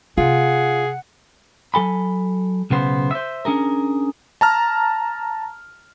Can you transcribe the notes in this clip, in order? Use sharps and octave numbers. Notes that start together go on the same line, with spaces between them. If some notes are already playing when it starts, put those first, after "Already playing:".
C3 F4 G#4 F#5
F#3 A4 G#5 B5
B1 C#3 B3 C5
C5 E5
C#4 D4 G#4 A#4
A5 A#5 F6